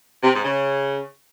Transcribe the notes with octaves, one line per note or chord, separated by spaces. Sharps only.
C3
G#2
C#3